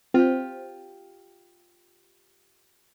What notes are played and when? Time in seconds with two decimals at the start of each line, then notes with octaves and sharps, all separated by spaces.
0.14 C4 F4 G4